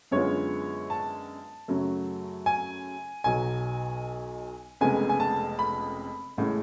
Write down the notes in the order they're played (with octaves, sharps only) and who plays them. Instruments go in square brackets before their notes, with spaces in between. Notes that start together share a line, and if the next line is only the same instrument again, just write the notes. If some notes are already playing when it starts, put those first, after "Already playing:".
[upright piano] F#2 D3 G#3 B3 F4 C#5
A5
F#2 C#3 F#3 A3
G#5
B1 B2 F#3 G#5
F1 F2 C#3 G#3 B3 G#5
G#5
A5
B5
A1 A2 G#3 C#4